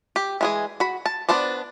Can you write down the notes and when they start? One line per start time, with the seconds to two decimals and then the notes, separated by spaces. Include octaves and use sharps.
0.16 G4
0.41 E3 G#3 G#4
0.80 F#4 B5
1.06 A5
1.29 B3 D4 C5 D5